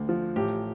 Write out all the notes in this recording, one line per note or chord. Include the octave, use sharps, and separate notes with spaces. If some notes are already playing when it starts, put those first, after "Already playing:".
Already playing: D2 D3
F3
A1 G4